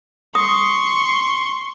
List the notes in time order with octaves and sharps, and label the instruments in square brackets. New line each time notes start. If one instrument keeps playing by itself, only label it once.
[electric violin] C6 C#6 [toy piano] D#6